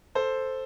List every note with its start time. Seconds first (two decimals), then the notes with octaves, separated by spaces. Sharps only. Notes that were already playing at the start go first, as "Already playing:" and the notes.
0.15 A4 C5